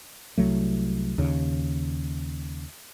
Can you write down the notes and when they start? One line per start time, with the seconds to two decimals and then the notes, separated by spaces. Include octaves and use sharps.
0.38 C2 F#3 A3
1.18 D#2 C#3